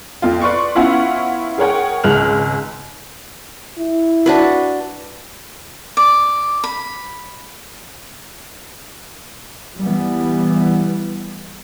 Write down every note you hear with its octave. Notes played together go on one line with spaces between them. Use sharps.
F2 F4
B4 D5 C6 C#6
B3 C#4 E4 F4 F5 F#5
G#4 A#4 C#5 F#5 G5
G#1 C#2 G#3 F6 F#6 F7
E4
D4 F#4 B4
D5
B5
E3 G3 B3